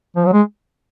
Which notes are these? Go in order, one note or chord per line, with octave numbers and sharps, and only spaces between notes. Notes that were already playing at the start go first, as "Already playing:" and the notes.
F3
F#3
G#3